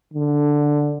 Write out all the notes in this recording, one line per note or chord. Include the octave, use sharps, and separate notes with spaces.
D3